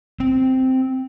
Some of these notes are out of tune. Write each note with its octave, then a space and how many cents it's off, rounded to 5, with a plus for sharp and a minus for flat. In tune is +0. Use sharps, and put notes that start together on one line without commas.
C4 -5